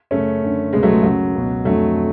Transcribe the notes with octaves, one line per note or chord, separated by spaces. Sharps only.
F#2 C#3 A3 C#4
F#2 D3
C#2 B2 G#3 B3
F#3 A3
G#3
F#2 C#3 F#3
C#2 B2
F2 D3 F#3 A3